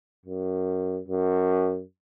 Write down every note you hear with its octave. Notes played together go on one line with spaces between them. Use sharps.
F#2
F#2